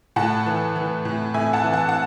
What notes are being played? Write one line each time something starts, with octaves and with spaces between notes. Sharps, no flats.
A2 F#5 A5
E3
E3
A2
A2 E5 G#5
F#5 A5
E3
F#5 A5
F#5